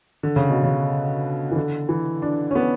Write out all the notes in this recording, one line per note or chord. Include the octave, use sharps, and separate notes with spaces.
D3
C#3
B2
C#3
E3
D3
E3
D4
C#4
B3